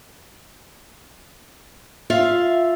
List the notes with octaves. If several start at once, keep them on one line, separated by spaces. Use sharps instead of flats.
F4 E5 F5